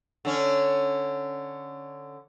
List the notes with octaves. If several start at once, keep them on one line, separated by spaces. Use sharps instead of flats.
D3 C#4